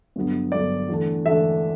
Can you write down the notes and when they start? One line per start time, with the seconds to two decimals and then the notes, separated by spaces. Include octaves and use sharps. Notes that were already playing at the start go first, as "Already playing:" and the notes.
0.16 G2 D3 F#3 B3
0.52 G2 D3 F#3 B3 D5
0.89 E2 D3 A3 D4
1.26 E2 D3 A3 D4 E5